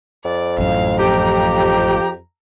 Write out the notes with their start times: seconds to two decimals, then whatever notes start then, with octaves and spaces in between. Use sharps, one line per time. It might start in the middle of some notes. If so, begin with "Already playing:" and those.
0.25 F2 D5
0.58 A1 F#2 A2 F5
1.00 F3 G4 A#5